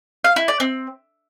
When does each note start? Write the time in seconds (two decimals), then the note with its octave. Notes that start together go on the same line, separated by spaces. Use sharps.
0.24 F5
0.36 E4
0.48 D5
0.60 C4